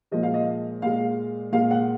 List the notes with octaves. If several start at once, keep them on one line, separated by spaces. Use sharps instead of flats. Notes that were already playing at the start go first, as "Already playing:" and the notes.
A#2 F3 G#3 D#5
F5
D#5
A#2 G#3 F5
A#2 G#3 F5
F#5